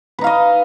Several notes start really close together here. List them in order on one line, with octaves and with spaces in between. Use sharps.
B4 D#4 F5 D#5